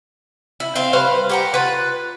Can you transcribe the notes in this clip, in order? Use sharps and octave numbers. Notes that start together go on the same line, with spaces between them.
E4
C4 C5 F5
G3 B4 C5 F5
G4 F#5 A#5
F4 B4